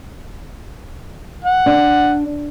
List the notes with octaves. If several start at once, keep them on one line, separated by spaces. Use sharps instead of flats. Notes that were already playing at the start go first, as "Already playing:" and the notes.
F#5
D4